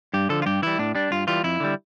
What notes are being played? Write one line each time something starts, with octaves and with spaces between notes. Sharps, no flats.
G2 G4
D3 F3 A4
F4
G2 G4
E3 G3 E4
A2 D4
G3 D4
G2 F4
E3 G3 F4
F2 E4
D3 G3